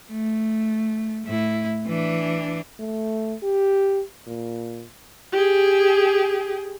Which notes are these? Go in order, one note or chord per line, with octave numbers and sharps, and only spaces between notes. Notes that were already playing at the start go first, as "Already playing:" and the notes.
A3
A2 E4
E3 D4
A3
G4
A#2
G4 G#4